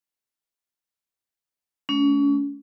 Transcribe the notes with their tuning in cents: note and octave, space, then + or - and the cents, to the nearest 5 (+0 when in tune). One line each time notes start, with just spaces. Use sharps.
A3 -30 C#4 +35